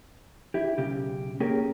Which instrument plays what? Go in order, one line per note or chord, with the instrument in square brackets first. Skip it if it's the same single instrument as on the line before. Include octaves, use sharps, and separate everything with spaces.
[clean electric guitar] E4 G4
B1 C#3 G4
A#3 C#4 G4 G#4 A#4